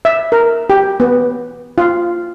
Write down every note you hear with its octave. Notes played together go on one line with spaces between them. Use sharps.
E5
A#4
G4
B3
F4